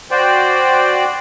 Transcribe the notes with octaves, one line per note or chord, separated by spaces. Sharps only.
F#4 C5 D5 G5